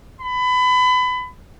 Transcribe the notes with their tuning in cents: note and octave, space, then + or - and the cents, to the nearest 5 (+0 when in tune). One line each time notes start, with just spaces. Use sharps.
B5 +25